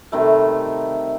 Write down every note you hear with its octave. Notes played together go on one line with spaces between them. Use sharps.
C3 D#3 G3 A3